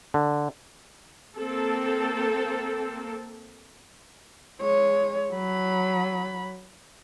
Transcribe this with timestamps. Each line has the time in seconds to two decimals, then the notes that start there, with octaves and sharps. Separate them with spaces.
0.14 D3
1.36 A#3 C4 A4
4.60 G#3 C#5
5.33 F#3 B5